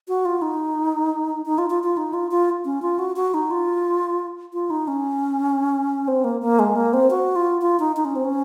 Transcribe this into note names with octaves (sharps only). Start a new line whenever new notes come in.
F#4
F4
D#4
D#4
F4
F4
F4
D#4
F4
F4
C#4
F4
F#4
F#4
D#4
F4
F4
D#4
C#4
C4
A#3
A#3
G#3
A#3
C4
F#4
F4
F4
D#4
D#4
C#4
C4
C#4